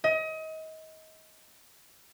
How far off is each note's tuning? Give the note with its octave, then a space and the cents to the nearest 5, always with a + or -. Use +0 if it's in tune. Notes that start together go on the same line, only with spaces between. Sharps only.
D#5 +30